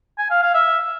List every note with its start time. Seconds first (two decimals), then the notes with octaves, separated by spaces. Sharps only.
0.18 G#5
0.30 F5
0.42 F5
0.54 E5